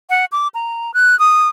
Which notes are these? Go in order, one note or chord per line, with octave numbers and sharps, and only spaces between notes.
F#5
D6
A#5
F#6
D#6